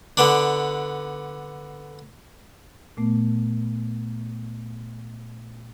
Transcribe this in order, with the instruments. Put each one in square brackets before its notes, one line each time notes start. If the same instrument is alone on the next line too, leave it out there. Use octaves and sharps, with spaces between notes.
[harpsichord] D3 B3 D4
[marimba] A#2 A3 B3